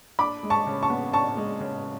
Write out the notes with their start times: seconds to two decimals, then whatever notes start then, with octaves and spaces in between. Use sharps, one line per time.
0.19 D4 B5 D6
0.43 G#3
0.50 A5 C#6
0.67 C#3
0.83 A5 C#6
0.90 B3
1.13 D4 A5 C#6
1.37 G#3
1.60 C#3